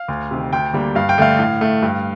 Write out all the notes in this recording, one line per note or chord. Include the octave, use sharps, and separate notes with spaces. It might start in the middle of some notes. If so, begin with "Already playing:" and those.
Already playing: F5
D2
C3 D#3
D2 G5
D3 G3 A#3
G2 F5
G5
D3 A3 F5
A2
A3
G2